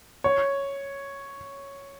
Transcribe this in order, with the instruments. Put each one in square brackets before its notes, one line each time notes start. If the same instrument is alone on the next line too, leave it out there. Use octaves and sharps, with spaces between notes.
[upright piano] C#5